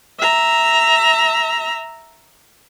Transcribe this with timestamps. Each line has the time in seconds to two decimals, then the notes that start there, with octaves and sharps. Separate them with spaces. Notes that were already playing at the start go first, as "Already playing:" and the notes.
0.19 E5 A#5